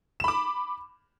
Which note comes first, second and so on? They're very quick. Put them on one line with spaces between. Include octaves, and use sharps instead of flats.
E7 B5 D6